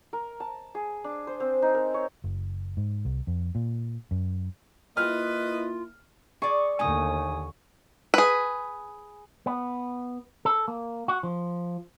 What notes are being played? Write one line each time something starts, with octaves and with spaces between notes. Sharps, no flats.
A#4
A5
G#4
D4
C5
C4
D#4
A#4
C#5
F#1
G#2
C2
F2
A#2
F#2
A#3 E4 F4 B4 D#5 F6
G#4 D5 C#6
D#2 D3 A3 D#4 G#5 D#6
G#4 B4
B3
A4
A#3
F#4
F3